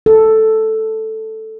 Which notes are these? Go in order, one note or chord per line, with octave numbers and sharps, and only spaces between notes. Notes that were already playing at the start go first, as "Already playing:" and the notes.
A4